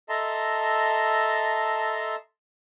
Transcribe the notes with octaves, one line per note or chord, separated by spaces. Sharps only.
A4 D#5 E5 A5 A#5 C6